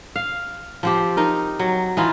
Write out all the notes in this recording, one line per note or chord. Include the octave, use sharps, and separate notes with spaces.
F5
F3 C4 G4
D#4 A#4
F#3
E3 D#4 F4